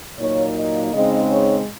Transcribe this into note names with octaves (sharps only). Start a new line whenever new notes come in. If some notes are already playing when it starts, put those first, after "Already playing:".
A#2 F#3 A#3 D#4 C#5
D#5
C#3 G#3 C4 D#4 D#5
C#5